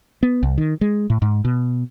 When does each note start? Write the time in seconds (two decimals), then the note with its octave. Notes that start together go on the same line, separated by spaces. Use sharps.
0.23 B3
0.43 C2
0.58 D#3
0.81 G#3
1.10 A2
1.22 G#2
1.45 B2